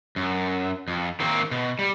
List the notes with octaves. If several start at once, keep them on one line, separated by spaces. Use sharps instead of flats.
F#2
F2
D#3 A#3 C4
B2
G3